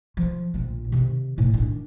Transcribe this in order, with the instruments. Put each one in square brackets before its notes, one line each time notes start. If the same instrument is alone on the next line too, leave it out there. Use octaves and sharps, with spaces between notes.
[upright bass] F3
A#1 F4
C3 D#3
A2
D#3 D4